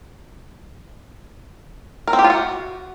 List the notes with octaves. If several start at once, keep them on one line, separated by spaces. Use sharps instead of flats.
A#4
C4
G4
F4
F#4